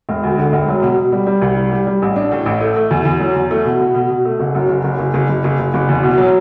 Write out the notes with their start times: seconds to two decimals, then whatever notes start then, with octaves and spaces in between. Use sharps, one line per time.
0.09 E1
0.23 D2
0.38 D3
0.52 E1
0.68 F#3
0.82 B2
0.97 B2
1.12 G3
1.27 G3
1.42 C2
1.57 G3
1.72 G3
1.87 G3
2.02 A1
2.16 D4
2.32 A2
2.46 A1
2.60 A3
2.76 A3
2.91 E2
3.05 E2
3.20 F#3
3.36 E2
3.51 A3
3.65 B2
3.80 B2
3.95 B2
4.10 B2
4.25 A3
4.39 F#1
4.55 F#2
4.69 F#1
4.84 F#1
4.99 F#1
5.14 F#1
5.29 F#1
5.44 F#1
5.59 F#1
5.74 F#1
5.89 E2
6.03 B2
6.18 F#3